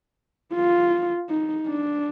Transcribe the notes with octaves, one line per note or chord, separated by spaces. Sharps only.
F4
D#4
D4